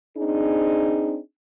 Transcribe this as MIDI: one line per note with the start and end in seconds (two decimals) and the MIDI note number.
0.17 1.18 60
0.17 1.18 62
0.17 1.18 63
0.17 1.18 68